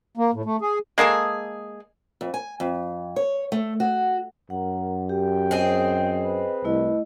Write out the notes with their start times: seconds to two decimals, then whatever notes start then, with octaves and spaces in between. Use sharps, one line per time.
0.17 A#3
0.34 A2
0.45 A3
0.61 G#4
0.98 G#3 A#3 G#4 A4
2.21 F2
2.34 G#5
2.60 F2
3.16 C#5
3.52 A3
3.80 F#4
4.50 F#2 A#4 F#5
5.09 G4 G5
5.51 C4 G#4 D#5
6.24 B4
6.65 C2 A3 E4 D#5